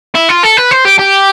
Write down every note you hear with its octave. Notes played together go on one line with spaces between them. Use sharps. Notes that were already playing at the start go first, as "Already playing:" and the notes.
E4
F4
A4
B4
C5
G4
G4